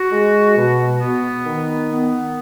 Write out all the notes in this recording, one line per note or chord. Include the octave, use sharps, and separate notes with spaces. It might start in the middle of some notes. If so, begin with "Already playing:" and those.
Already playing: F#4
G#3
B2
B3
D#3
B3